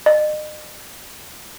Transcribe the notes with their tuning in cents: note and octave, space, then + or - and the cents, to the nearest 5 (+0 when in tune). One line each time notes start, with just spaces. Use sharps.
D#5 -35